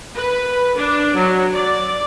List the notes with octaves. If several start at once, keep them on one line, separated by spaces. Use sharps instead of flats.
B4
D4
F#3
D5